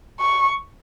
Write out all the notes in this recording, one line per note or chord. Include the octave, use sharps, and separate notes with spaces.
C#6